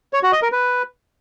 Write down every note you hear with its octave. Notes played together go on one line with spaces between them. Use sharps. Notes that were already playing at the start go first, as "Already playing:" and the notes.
C#5
F#4
D#5
A#4
B4